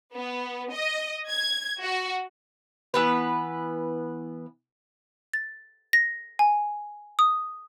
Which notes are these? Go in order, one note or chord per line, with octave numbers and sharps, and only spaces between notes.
B3
D#5
G#6
F#4
E3 B3 B4
A6
A#6
G#5
D#6